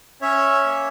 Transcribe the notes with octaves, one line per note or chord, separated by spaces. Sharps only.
C#4 C#5 E5
A#3